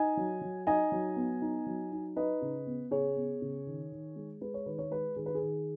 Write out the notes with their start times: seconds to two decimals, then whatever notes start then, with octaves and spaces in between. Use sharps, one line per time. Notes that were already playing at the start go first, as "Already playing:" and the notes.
Already playing: D#4 D#5 G#5
0.17 F#3
0.41 F#3
0.67 D#4 D#5 G#5
0.92 F#3
1.16 B3
1.42 D#4
1.66 F#3
1.92 D#4
2.16 D#4 B4 D#5
2.41 C#3
2.67 B3
2.91 C#3 G#4 C#5
3.16 B3
3.42 C#3
3.66 D#3
3.92 D#3
4.16 G#3
4.41 G#3 B4
4.54 C#5
4.66 D#3 B4
4.79 C#5
4.91 G#3 B4
5.16 D#3 G#4
5.26 B4
5.35 G#4
5.42 D#3